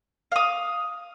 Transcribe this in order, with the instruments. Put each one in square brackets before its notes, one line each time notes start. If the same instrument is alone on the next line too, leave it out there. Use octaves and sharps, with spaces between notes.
[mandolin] F5 D#6